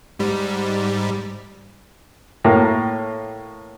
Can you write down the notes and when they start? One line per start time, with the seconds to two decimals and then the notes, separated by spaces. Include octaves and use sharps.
0.19 G#2 G3
2.45 A2 A#3